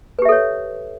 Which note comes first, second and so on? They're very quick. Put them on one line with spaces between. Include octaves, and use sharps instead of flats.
B4 G4 E5 A4 C#5